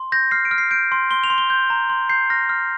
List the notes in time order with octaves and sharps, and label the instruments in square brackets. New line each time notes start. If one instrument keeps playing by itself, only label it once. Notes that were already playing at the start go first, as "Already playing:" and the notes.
Already playing: [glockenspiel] C6
G6 A#6
F6 C7
D7
F6
C7
G6 D7
C6
C6 G7
F7
C6
G7
G6
A#5
C6
G6 C7
F6 A#6
F6